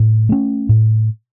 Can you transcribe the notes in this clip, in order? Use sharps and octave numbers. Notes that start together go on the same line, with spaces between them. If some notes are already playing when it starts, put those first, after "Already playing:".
Already playing: A2
A3 C#4
A2